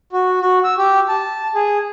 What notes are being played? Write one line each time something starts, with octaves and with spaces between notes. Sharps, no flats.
F#4
F#4
E6
G4
A5
G#4